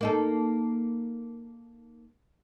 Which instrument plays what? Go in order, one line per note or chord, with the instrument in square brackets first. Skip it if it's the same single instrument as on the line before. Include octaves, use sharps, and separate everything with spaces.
[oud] A#3 D#4 A4